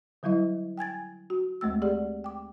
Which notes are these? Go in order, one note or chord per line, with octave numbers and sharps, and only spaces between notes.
D3 F#3 G3 E4 D#5
G5 G#5 G#6 A6
F#4
D2 G#3 A3 E6
G4 G#4 D5 F#5
G5 D6